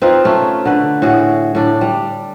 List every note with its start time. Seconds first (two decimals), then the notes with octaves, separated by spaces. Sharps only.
0.02 C4 D#4 F4 B4
0.25 A3 C#4
0.65 D3 B4
1.02 A2 F#4 G#4
1.55 A2 D4 D5
1.81 G3